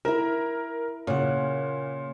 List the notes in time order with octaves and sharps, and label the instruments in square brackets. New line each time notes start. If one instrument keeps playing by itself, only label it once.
[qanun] E4 E5 [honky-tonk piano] A#4
[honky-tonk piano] A#2 [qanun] C#3 F#5